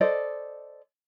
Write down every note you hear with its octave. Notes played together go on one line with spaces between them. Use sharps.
A4 C5 D5 D#5